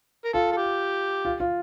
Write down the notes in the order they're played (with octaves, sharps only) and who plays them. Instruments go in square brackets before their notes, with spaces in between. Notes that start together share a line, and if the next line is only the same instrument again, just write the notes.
[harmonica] A#4
[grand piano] F4 [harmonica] A4
[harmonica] A4
G4
[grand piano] F4
F4